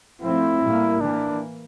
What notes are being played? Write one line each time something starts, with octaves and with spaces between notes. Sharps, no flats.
A2 F3 A3 C4 E4
A2 G3 A#3
E3 A#3 D4